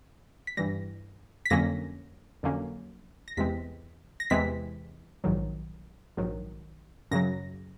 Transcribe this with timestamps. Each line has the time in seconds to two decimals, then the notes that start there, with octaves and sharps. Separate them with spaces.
0.47 B6
0.57 G2 E3 G3 A#6
1.45 B6
1.50 F2 D3 F#3 A#3 C#4 A#6
2.43 F2 D3 F#3 A#3 C#4
3.28 A#6
3.37 E2 C3 E3 G#3 C4 B6
4.20 A#6
4.30 E2 C3 E3 G#3 C4 B6
5.24 A#1 G#2 D#3 F#3
6.17 A#1 G#2 D#3 F#3
7.11 F#2 C#3 F#3 A#6